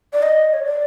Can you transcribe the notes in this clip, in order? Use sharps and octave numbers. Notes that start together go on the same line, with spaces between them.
D5
D#5
C#5
D5